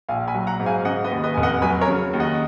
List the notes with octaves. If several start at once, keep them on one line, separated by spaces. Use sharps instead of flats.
A#1 F5 G#5
G#5 B5
F#3
F#5 A#5
G#2
F5 G#5
C#3 D#5 F#5
B4 D#5
D#2
B4 D#5
F1 G#5
D#5 F#5
F#3 G#5 B5
A#4 C#5
C#3
D#2
D#5 F#5